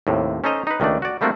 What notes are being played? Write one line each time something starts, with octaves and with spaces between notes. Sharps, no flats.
D#2 A2 C3
C#4 D#4 A4 C5 D#5 A#5
D#4 B4
C#2 D#3 A3 D4 D5
F#4 D5
G3 A3 A#3 C4 D4 F#4